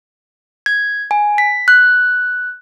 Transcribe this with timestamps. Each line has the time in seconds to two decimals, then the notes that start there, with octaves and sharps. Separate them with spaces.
0.66 G#6
1.11 G#5
1.38 B6
1.68 F#6